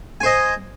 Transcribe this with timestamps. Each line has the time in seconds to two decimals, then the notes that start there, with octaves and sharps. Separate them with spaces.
0.21 G#5
0.23 C5
0.26 D#5